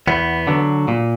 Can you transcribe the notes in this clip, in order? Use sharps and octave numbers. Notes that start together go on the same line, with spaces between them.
E2 B3
D3 F#3
A#2